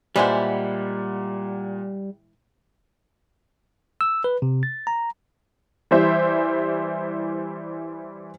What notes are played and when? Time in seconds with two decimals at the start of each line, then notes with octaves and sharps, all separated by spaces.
0.16 A#2 E3 G3 G#3 E4 C5 F#5
4.01 E6
4.24 B4
4.42 C3
4.63 A6
4.87 A#5
5.91 E3 G3 C5 E5